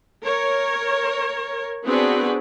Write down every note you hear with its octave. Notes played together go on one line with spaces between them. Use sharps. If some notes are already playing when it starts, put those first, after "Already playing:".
A#4 C#5
B3 C4 D4 F#4 G#4 B4